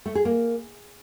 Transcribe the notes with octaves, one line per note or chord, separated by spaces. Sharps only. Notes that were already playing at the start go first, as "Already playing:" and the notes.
A3
G#4
A#3